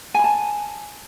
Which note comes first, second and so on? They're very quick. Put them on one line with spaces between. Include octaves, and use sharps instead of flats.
G#5 B5 A5